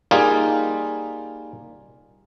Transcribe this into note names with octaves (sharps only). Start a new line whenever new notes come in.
G3 A#3 D#4 F4 G#4